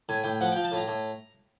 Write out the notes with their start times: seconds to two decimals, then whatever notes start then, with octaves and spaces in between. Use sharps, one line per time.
0.09 A2 G#5
0.24 A2 G5
0.41 F3 F#5
0.52 F3 G5
0.64 A5
0.72 A2
0.77 A#5
0.88 A2